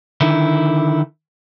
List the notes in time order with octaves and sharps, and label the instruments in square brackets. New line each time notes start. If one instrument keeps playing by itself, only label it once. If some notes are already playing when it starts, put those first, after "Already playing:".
[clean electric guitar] D3 D#3 E4